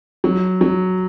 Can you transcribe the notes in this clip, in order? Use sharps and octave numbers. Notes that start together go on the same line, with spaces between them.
F#3
F#3